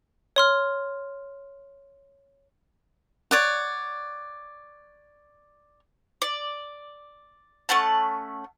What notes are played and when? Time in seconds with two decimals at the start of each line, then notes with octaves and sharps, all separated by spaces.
0.36 C#5 C6 F6
3.31 C#5 D5 F#5
6.22 D5
7.69 A3 C#4 F#5 A5